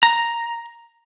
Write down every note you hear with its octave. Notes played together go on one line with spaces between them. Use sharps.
A#5